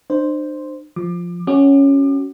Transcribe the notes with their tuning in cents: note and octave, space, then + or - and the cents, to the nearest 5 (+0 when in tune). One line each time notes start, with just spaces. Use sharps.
D4 +45 C5 +0
F3 +0 D6 +30
C#4 +0 F#4 +25 D6 +35